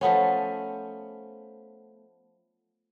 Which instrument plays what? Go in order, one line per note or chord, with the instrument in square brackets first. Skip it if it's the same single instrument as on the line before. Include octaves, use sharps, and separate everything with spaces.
[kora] F3 A3 B3 C#4